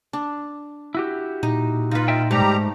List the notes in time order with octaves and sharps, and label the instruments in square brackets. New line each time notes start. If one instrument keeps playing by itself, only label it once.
[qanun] D4
[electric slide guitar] E4 F#4 G4
[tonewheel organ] A#2 [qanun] D#4
[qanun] D#4 B4 [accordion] F4
[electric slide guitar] D#5 E5 G5
[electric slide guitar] G#2 [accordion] G3 G4 A#5 [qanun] A3